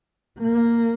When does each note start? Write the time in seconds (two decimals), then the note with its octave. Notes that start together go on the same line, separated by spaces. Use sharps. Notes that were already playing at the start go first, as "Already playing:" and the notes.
0.40 A#3